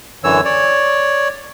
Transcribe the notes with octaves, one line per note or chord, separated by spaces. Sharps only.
F#2 D3 E3 C#5 E6
C#5 D5